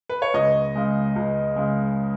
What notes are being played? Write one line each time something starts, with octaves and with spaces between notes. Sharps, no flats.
B4
C#5
C#2 D#5
C#3 G#3
C#2
C#3 G#3